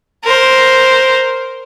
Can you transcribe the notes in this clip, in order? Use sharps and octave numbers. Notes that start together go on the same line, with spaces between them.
A#4 C5